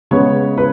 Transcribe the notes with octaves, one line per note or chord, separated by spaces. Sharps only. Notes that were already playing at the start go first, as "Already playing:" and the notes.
C#3 G#3 B3 C#5
B4